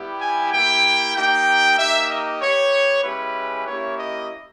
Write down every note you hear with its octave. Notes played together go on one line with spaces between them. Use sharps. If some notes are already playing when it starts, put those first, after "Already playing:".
Already playing: G3 B3 E4 G4
G#5
A#3 E4 G4 G5
A#3 D#4 G4 G5
A#3 D#4 G4 E5
D#5
B3 G4 C#5
G#3 C#4 E4 G4 B4
A#3 C#4 E4 G4 C#5
D#5